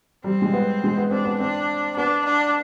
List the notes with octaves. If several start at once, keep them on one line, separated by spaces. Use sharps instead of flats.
G3 C4
G#3
B3
G#3
B3
C4 D4
B3
C4 D4
B3 D4
D4